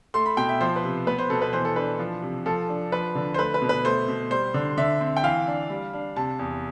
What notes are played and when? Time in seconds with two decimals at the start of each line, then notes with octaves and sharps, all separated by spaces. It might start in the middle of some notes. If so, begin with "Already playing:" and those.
0.14 A3 C6
0.26 B5
0.37 B2 G5
0.49 E5
0.61 F3 C5
0.76 B4
0.84 C3
1.07 B3 B4
1.18 C5
1.30 B2 A4
1.42 B4
1.53 E3 C5
1.65 A4
1.76 D4 B4
1.99 F3
2.22 C3
2.46 F3 A4
2.69 D4
2.92 F3 B4
3.15 D3
3.34 C5
3.38 A3 B4
3.54 B4
3.62 B2
3.69 B4
3.85 A3 C5
4.08 B2
4.31 G3 C5
4.54 D3
4.77 D3 E5
5.01 C4
5.17 G5
5.23 E3 F5
5.47 D4
5.70 G3
5.93 D4
6.16 C3 A5
6.39 E2